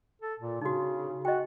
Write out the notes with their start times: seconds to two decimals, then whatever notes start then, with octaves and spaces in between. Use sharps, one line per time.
0.22 A4
0.39 A#2
0.61 C#3 D#4 F#4
1.25 F#4 D#5 G5